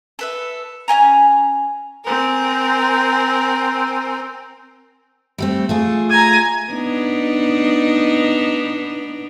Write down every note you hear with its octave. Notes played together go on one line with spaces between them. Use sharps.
A4 B4 E5
C#4 D#5 G#5 A#5
C4 A#4 G#5
G3 A3 C4
A3 F4 G#4
G#5 A#5
B3 D4 D#4